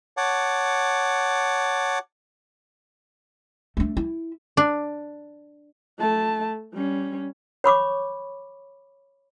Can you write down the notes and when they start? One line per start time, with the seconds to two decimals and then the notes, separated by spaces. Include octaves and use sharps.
0.17 C#5 F#5 A5 D6
3.77 A3 D4
3.97 E4
4.57 D4
5.98 A3 A5
6.73 G3 C#4
7.64 C#5 B5 C#6 D6